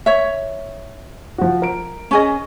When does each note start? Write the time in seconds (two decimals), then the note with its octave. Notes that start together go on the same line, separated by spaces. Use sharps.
0.06 C#5 E5
1.38 F3 F#4
1.62 A#4 D7
2.11 C#4 G#4 D#5